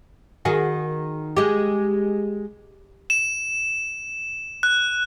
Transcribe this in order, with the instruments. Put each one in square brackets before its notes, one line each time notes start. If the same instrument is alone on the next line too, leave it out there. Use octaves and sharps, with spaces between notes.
[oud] D#3 F#4 G#4
G#3 G4
[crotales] E7
F#6